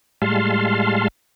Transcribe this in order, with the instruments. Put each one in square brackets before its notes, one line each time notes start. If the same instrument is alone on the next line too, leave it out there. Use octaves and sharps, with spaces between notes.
[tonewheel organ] A2 G3 G#3 F5 A5 C6